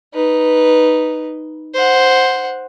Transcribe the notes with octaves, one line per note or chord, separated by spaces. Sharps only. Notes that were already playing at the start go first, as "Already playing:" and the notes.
D#4 B4
C5 F#5